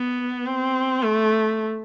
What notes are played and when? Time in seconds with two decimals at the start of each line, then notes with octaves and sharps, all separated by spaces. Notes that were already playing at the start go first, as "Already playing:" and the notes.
Already playing: B3
0.46 C4
1.03 A3